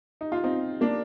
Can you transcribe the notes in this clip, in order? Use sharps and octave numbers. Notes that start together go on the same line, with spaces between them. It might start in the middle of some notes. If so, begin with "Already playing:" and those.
D#4
F4
C4 D#4
A#3 D4